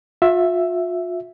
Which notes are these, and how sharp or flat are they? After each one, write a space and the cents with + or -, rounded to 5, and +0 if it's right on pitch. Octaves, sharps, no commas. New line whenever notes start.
F4 +40 E5 +5